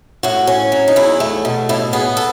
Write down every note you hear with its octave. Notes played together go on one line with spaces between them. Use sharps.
A2 F#4
C#4
F#3
D#4
E2 E4
A3
B2
A2 E4
B3 G#4
A4